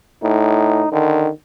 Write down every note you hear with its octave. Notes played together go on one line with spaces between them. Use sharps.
A2 D#4
D3 D#3